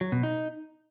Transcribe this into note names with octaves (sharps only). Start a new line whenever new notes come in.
F#3
B2
D#4